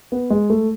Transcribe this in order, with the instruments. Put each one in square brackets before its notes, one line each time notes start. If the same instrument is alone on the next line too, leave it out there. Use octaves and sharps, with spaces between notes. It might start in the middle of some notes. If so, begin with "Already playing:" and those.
[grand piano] B3
G#3
A3